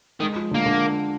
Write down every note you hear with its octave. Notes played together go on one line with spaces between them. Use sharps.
D#3 G#3
F3
D3 A#3
D3